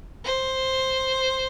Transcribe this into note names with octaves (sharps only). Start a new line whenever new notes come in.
C5